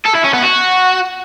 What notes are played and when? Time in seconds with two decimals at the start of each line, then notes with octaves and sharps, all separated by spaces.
0.06 A4
0.15 E4
0.25 C#4
0.34 B3
0.44 F#4